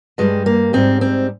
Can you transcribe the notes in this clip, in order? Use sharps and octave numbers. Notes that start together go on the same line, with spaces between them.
G2 G3 G#3
A#3
G#2 G3 C4
C4